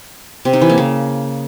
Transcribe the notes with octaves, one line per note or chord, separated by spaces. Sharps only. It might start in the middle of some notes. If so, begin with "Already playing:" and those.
C3
D#4
E3
A#3
C#3